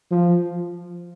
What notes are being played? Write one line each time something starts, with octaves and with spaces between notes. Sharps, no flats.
F3